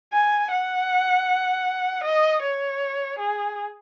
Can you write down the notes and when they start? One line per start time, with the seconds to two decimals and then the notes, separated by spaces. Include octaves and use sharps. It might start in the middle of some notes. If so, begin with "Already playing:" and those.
0.13 G#5
0.51 F#5
2.05 D#5
2.43 C#5
3.19 G#4